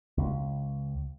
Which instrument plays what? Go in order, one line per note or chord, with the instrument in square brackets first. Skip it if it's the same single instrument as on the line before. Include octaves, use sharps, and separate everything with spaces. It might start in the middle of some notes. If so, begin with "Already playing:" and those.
[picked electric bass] C#2